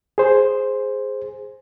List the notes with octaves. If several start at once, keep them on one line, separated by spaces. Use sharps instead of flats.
G#4 C5